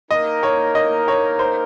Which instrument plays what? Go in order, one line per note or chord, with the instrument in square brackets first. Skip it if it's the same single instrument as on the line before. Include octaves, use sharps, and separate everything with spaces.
[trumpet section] A#3 D#4 A#4 [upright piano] D#5
[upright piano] C#5
D#5
C#5
C5